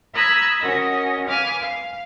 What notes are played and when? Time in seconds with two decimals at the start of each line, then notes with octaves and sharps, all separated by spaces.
0.14 A#5 B5 D#6 E6 F#6 G#6
0.60 C#4 F#4 A#4 D#5
1.28 B4 F5 G#5 D6 D#6 F6
1.62 F5